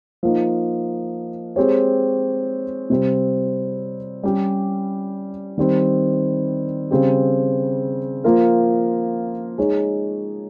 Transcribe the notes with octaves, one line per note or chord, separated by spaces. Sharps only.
F3 A#3 D#4
G#3 C4 G4 C#5
C3 G3 C4
G3 C#4 G4
D#3 G3 C4
C#3 G3 C4 G4
F3 A#3 F4 A#4
G#3 D#4 G#4 C#5